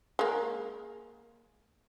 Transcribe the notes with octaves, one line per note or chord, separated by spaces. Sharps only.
G#3 A#3